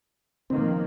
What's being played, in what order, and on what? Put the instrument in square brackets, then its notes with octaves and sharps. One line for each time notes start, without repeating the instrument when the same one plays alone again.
[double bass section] D#3 F3 A#3 [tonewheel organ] C4